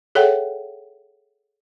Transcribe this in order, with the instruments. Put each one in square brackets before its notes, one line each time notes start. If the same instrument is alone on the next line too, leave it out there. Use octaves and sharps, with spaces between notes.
[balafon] G#4 A4 C#5 E5 F#5 G5